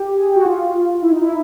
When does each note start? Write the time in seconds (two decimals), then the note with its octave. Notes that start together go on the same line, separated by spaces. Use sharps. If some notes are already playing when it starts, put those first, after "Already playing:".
Already playing: G4
0.17 G#4
0.36 F#4
0.45 F4
1.02 E4
1.11 D#4
1.21 E4